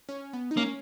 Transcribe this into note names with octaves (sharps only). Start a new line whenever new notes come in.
C#4
B3
D#4
A#3 C#4